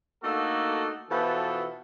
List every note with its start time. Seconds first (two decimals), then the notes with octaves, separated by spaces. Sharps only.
0.23 A3 A#3 D4 D#4 F#4 A4
1.09 B2 E3 F3 B3 A4